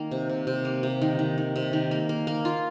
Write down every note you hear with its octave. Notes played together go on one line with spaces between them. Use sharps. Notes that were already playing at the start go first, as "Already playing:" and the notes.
Already playing: D#3 A#3
C3
C3
C3
A#3
C3
D#3
D#3
D#3
C3
D#3
A#3
A#3
A#3
F4